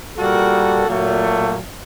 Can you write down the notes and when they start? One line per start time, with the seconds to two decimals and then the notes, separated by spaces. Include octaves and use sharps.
0.17 A#2 G3 A#3 F#4 A4
0.86 A#2 F#3 A3